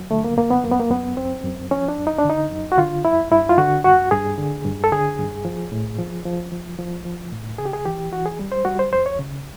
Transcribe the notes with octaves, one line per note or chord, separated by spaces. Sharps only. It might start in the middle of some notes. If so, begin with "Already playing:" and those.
Already playing: F#3
D3 A3
A#3
F#2 A#3
B3
F#2 A#3
B3
A#3
F#2 B3
F#2 C4
F#2
F3 C#4
D4
F#2
D#4
D4
D3
D#4
F#2
F#4
D3 F4
F#2 E4
G2 E4
F4
D3 F#4
G2 F#4
G2 G#4
D3
G2
A4
D3 G#4
G2
F3
A2
F3
F3
F3
F3
F3
A2
C#3 G#4
G4
G#4
E3 G4
E3 F#4
G#4
G3
C5
G3 F#4
C5
F2 C5
C#5
C#3